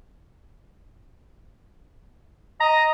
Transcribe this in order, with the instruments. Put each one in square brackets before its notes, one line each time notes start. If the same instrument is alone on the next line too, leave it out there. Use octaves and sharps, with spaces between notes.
[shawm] D#5 [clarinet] A#5